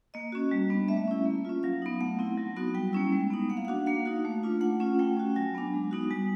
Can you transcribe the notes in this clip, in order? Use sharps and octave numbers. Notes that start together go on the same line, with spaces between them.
A#3 D#5
C#4 F#4
G3
B3 D4
A3 E5
C#4 E4
A#3
C#4 F4
F#3 F5
B3 D#4
A3 F#5
C4 E4
F#3
B3 D#4 F#4
G3 G5
A#3 C#4 E4
G#3
B3 D#4
A#3 F#5
F5
F#5
D4 F#4
A#3 F5
D#4 F#4
A3
D4 F4
A3 F#5
C#4 F4
A3 G5
C#4 F#4
F#3 G#5
B3 D4
G#3
B3 D#4 F#4
G3 G#5